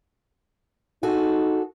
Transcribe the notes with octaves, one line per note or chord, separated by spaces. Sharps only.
D#4 F#4 G#4 A4